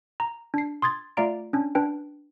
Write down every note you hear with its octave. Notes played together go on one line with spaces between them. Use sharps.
A#5
D4 C7
C6 D#6 G#6 A6
A3 F4 D5 F5 A#5 D7
C#4 D4
D4 B4 G5